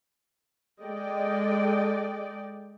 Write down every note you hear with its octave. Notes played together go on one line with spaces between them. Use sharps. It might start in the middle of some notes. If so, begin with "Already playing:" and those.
G#3 A4 D5 D#5 G5